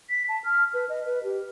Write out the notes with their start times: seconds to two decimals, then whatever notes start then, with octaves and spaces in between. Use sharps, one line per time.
0.10 B6
0.29 A5
0.44 F6
0.74 B4
0.89 D#5
1.06 B4
1.24 G4